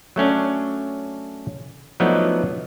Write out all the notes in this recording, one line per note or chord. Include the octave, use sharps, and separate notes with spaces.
F#3 A3 C#4 D4
F3 F#3 A3 B3 D4 D#4